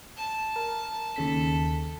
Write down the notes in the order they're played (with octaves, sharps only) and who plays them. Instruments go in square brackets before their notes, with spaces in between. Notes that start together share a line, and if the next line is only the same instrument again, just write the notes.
[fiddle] A5
[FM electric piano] A#4
[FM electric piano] D#2 C#3 B6 [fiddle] A4